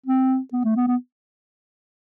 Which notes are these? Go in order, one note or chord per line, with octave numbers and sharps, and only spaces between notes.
C4
B3
A3
B3
B3